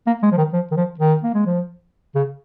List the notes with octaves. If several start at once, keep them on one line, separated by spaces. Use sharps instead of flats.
A#3
G#3
F3
D#3
F3
D#3
F3
D#3
A#3
G#3
F3
C#3